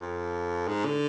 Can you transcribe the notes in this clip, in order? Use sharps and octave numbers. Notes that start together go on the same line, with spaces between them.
F2
G#2
D3